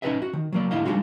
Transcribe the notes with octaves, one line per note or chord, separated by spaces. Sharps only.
C#4 D#4 G#4 B4 D#5 E5
F#4
D#3
F#3 A#3 D5
G#2 D3 E4 D#5 F5
G3 G#3 D4 D#4 F4 F#4